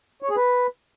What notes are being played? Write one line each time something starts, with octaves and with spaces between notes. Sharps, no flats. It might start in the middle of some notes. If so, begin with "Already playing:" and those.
C#5
G#4
B4